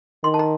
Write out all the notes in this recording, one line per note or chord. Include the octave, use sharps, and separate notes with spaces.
D#3 C6
A5
A#5